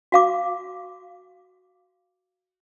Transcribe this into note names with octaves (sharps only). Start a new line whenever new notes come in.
F#4 F5 D6